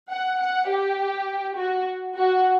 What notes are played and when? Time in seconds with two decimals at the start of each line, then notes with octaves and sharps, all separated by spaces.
0.10 F#5
0.40 F#5
0.69 G4
1.57 F#4
2.16 F#4